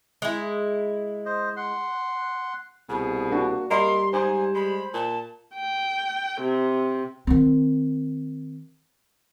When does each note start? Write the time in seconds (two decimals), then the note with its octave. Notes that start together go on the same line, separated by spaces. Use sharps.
0.22 G#3 E4
1.26 C5 D#5
1.56 F#5 C6
2.89 C2 B2 G#4
3.30 A#3 D4 F#4
3.71 G3 A#3 D5 D#5 B5 C6
4.13 G#2 C5 G#5
4.55 G#3 B5
4.94 A#2 A5
5.56 G5
6.42 C3
7.27 D#3 C4